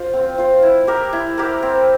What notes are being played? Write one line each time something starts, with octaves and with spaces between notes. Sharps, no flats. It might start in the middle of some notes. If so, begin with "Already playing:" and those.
Already playing: F4 C5
C4
F4 C5
E4
G4 A#4
E4
G4 A#4
C4